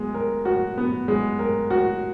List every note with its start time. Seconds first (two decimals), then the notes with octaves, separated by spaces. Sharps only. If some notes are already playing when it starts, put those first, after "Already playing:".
Already playing: G#3 B3
0.14 A#4
0.45 F#4
0.78 B3
1.08 G#3
1.39 A#4
1.70 F#4